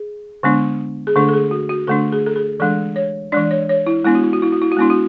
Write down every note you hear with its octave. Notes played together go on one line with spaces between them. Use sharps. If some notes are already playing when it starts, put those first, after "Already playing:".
Already playing: G#4
D3 G#3 B3 D4
G#4
D3 A3 D4 A4
A4
G#4
F#4
F#4
D3 A3 D4 A4
G#4
A4
G#4
E3 G#3 D4 A4
C#5
E3 G#3 D4 D5
C#5
C#5
E4
G#3 B3 D4 E4
F#4
E4
F#4
E4
F#4
E4
F#4
G#3 B3 D4 E4
F#4